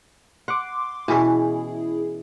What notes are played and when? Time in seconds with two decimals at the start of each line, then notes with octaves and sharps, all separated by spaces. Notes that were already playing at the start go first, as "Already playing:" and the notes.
0.48 F#5 C6 D6
1.08 B2 E3 C#4 E4 G#4